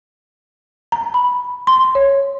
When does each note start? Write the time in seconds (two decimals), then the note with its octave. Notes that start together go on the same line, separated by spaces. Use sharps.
0.92 A#5
1.14 B5
1.67 C6
1.95 C#5